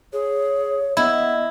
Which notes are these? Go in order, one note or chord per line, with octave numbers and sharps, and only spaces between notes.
G#4 C#5
B3 E4 D#5